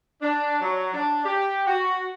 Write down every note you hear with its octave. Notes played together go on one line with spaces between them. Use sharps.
D4
F#3
D4
G4
F#4